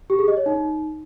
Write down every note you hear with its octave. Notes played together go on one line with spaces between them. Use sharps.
G4
G#4
D#5
C#5
D#4